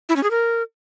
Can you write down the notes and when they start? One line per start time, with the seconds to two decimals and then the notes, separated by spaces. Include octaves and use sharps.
0.09 E4
0.16 C#4
0.23 G#4
0.31 A#4